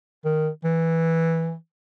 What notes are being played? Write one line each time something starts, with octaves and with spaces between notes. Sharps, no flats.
D#3
E3